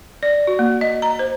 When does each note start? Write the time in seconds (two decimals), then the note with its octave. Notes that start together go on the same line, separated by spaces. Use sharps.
0.23 D5
0.47 F#4
0.59 A#3
0.81 D#5
1.02 A#5
1.19 C5